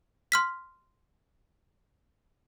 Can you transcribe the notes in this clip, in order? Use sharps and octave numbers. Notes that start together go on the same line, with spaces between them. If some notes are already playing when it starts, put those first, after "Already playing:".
C6 F6 B6